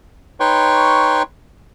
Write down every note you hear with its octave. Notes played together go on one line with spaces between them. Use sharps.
D#4 B4 C#5 G5 C6 C#6